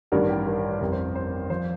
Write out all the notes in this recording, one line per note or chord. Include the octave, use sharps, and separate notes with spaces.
A1 G2 D#3 G3 A#4
G4
A#4
F2 C3 G3 A#4
C5
C5
F3 C5